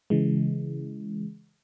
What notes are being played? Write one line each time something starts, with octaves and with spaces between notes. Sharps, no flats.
C#3 E3 G#3